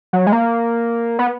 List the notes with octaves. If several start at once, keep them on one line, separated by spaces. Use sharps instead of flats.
F#3
G#3
A#3
B3